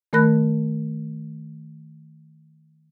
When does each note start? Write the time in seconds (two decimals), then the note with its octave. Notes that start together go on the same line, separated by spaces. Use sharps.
0.13 D#3 A3 A#4 B5 F#6 A#6